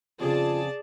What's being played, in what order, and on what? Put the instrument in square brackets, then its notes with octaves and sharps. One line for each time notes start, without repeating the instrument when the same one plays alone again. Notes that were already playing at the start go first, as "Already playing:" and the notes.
[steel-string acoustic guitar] F2 C#3 [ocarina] F4 [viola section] G#4 D5 A5